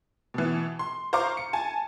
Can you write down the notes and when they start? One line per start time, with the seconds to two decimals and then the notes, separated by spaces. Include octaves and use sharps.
0.34 B2 E3
0.79 C6
1.13 C5 F5 A#5 C#6 D6
1.37 C#7
1.53 G#5 A5